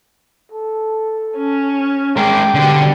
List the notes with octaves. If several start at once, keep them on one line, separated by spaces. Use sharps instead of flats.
A4
C#4
G#3 A#4 G5 D6
B2 D3 G3